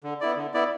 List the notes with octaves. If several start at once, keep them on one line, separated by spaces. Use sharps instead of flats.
D3
B3 E4 D5
D3
B3 E4 D5